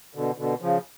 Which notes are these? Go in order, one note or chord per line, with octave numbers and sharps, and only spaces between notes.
B2 D3
B2 D3
C#3 F3